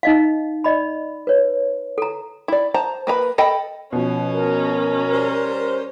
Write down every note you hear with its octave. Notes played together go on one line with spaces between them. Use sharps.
D#4 D#5 F5
D5 D#5 B5
B4 C#5
A4 A#5
E4 D5
C5 A5 A#5
A#3 B4 A#5 B5
A4 D#5 G5 B5
B2 F3 C#4
A#4
G3 C5